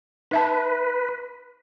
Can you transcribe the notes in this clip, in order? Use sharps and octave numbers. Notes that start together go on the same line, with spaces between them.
D#4 B4 E5 A5